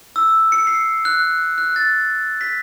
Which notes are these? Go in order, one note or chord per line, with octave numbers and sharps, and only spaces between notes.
E6
C#7
C7
F#6
F#6
A6
B6